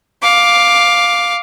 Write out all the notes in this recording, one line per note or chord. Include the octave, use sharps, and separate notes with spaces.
F5 D6